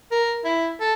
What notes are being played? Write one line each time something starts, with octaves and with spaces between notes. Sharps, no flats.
A#4
E4
A4